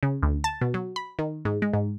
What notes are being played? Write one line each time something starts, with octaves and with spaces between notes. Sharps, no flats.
C#3
D2
A5
B2
F#3
B5
D#3
G#2
G#3
G#2